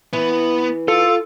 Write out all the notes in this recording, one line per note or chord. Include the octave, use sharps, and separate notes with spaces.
E3 B3
F4 A4